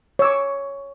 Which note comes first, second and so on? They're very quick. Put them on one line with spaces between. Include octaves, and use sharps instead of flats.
C#5 E6 D6